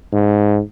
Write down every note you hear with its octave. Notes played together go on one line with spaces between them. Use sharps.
G#2